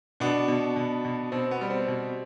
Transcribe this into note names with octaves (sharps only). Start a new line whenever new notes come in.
B2 B3 D4
B2
B2
B2
B2 C4
B3
G3
C4
B2